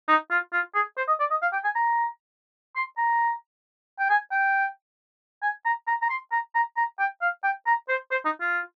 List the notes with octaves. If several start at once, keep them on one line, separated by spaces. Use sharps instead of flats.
D#4
F4
F4
G#4
C5
D#5
D5
D#5
F5
G5
G#5
A#5
C6
A#5
G5
G#5
G5
G#5
A#5
A#5
A#5
C6
A#5
A#5
A#5
G5
F5
G5
A#5
C5
C5
D#4
F4